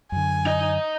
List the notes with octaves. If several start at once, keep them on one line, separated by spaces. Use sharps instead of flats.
F#2 D3 G#5
D#4 D#5